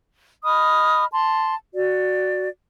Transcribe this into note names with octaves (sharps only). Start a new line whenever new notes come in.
D#5 B5 D#6 F6
A5 C6
F#4 D5